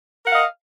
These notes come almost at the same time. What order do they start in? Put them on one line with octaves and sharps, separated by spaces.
A#4 F#5 F5 D#5